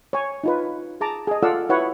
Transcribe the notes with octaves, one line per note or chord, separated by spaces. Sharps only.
C#5 G#5
D#4 F4 B4
G#4 A5 A#5 D6
G#4 D#5
F4 A4 D5 F5 F#5 E6
E4 F#4 B4 C#5 F#5